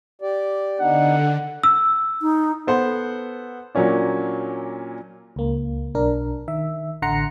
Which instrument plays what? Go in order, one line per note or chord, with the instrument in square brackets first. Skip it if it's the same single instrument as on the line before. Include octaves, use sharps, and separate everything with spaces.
[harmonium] G4 D5
[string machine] D3 [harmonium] B3 D4 D#4 [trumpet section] F#5
[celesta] E6
[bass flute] D#4
[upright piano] B3 A4 C5 F#5
A#2 F#3 A#3 C#4 D4
[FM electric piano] C#2 A#3
B1 D4 A#4
D#3 E5
A1 D3 F#5 A#5 C6 C#7